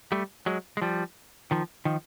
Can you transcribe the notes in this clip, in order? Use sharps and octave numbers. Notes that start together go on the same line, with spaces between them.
G3 A3
F#3 G#3
G#3
F3 G3
D#3 F3
D#3 F3